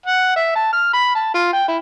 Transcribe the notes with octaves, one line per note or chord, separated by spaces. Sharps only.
F#5
E5
A5
F6
B5
A5
F4
G5
E4